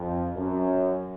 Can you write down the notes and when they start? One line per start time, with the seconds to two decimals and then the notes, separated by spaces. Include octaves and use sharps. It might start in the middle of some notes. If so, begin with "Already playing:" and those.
Already playing: F2
0.36 F#2